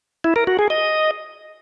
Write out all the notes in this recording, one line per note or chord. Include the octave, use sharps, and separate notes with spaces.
E4
A#4
F#4
G#4
D#5